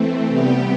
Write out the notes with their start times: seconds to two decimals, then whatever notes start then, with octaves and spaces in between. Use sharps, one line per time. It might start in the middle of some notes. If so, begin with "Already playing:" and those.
Already playing: E3 A3 C4
0.27 C3 G3 B3 G4